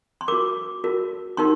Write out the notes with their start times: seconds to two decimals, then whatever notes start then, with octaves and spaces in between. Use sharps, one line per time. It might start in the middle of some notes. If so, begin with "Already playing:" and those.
0.21 C6
0.28 F#4 A#4 D6
0.84 F#4 A#4
1.37 D#4 G4 A#4 C6